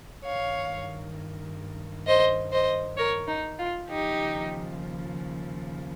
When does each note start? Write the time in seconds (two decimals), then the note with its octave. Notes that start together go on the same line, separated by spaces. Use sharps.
0.24 G2 D#3 C#5 F5
2.07 C5 D#5
2.52 C5 D#5
2.97 A#4 C#5
3.28 D#4
3.59 F4
3.89 D#2 C#3 F3 D#4 G4